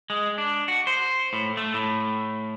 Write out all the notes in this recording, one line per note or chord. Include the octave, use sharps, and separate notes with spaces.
G#3
D4
F#4
C5
A2
A3
A2